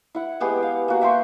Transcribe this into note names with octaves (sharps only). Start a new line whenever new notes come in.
E4 F#5
G#3 B3 G4 G#4
F5
A#3 F#4
E5 G5 C6 C#6